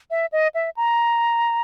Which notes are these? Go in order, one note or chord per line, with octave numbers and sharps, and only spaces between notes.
E5
D#5
E5
A#5